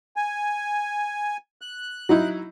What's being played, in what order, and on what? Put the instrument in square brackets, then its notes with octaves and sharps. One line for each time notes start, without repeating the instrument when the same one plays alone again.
[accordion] G#5
F#6
[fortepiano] F#3 D#4 E4